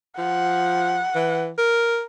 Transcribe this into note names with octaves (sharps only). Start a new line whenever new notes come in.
F3 F#5
E3
A#4